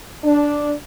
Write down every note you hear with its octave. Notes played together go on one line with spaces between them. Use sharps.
D4